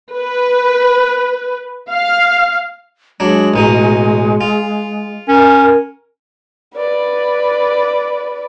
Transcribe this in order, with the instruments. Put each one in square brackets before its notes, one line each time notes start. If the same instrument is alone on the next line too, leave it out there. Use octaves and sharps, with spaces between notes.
[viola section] B4
F5
[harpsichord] F#3 D4 [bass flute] G#3
[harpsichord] A1 B2 D#4
F4
[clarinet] C#4 [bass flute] A#4
[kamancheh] B4 D5